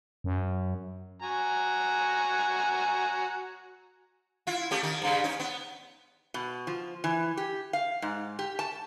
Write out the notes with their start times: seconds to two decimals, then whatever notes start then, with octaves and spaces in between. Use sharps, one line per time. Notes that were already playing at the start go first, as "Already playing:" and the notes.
0.24 F#2
1.22 F#4 G#5 A#5
4.47 E4 F4
4.71 A3 C#4 G4
4.83 D#3 D#4
5.02 G2 C#3
5.24 C#4 D#4
5.40 B3
6.34 B2
6.67 F3
7.04 E3
7.37 G4
7.73 F5
8.02 G#2
8.39 G4
8.59 A5